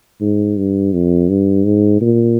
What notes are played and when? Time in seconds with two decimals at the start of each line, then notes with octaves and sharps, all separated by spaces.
0.21 G#2
0.57 G2
0.93 F2
1.29 G2
1.65 G#2
2.01 A#2